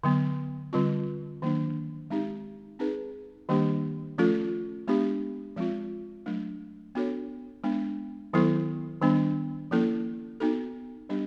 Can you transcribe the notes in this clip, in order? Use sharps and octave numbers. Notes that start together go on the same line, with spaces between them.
D3 F#3 B3
D3 G3 C4 F4
D#3 F#3 A#3 D4
G#3 C4 D#4 G4
C4 D#4 G#4 B4
D#3 G3 A#3 D4 G4
F3 A3 C#4 F4 A4
G#3 B3 D4 G4
F3 G#3 C4 F4
F#3 A3 D4
B3 D4 F#4 A4 C#5
G#3 B3 D4
D#3 F#3 B3 E4 A4
D#3 G3 B3 D4
F3 A#3 C#4 E4 A4
B3 D#4 F#4 A4
G3 B3 D4 G4